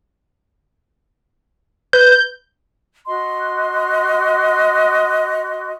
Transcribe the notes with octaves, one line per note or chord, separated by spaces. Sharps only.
B4 G6
F#4 D#5 C6